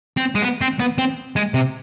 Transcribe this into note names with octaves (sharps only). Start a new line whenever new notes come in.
C4
G#3
B3
C4
B3
C4
G#3
C3